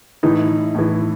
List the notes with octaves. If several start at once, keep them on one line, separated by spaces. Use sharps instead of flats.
A2 E3 D#4
A2 E3